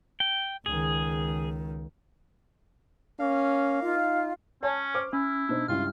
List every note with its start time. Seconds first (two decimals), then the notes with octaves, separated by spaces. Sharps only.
0.20 G5
0.66 C#2 D#3 G#4
3.19 A#3 C#4 F5
3.82 D#4 F4
4.63 C#4 C#5 G#5 A5
4.94 C5 D6 F6
5.13 C#4 E4 B5
5.49 B2 D4 D#4 C5
5.68 C#2 G2 E4 F4 F6